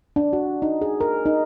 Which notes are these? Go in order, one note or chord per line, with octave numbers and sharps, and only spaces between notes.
D4
F#4
D#4
G#4
A#4
D#4